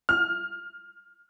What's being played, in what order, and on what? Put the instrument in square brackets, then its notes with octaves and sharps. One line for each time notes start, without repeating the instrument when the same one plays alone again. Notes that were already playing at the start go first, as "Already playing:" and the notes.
[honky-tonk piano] F6